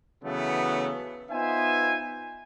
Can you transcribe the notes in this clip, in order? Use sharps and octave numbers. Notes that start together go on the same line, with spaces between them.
C#3 E3 F#3 A3 B3
B3 D#4 F4 C5 E5 G#5